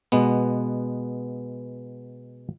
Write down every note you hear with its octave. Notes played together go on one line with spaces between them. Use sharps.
B2 G#3 B3